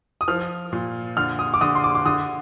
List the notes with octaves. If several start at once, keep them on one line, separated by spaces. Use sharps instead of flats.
D#6
F3 F6
A#2
D3 F6
D#6
D6
D3 D#6
C6
D6
D6
D3 D#6